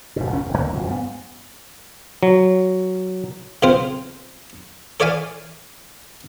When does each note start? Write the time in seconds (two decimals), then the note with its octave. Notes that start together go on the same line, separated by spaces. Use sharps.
0.16 F1 G#2 B2
0.30 A#1 F2 A#2 C#4
0.46 D#1 E2
0.57 D2 D3 E3 A#3
0.73 D1 F#2 F3 F#3
0.90 G2 B3
2.23 F#3
3.63 B1 C#3 C4 F4 C5
5.00 A4 C#5 D5 E5 F5 G#5